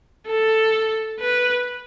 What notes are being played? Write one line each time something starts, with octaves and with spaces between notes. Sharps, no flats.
A4
B4